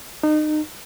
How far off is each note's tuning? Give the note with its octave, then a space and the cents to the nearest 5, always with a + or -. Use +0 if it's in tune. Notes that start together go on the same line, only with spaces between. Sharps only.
D#4 -30